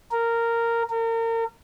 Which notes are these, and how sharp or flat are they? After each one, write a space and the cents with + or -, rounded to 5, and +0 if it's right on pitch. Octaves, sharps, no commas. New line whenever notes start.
A#4 -10
A#4 -35